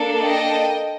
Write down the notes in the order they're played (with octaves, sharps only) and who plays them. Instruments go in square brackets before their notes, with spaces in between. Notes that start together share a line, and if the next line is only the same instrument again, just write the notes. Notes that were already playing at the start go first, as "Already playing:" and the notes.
Already playing: [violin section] A#3 D4 A4
D#5 G5